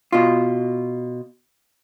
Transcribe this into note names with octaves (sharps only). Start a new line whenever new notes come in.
B2 F4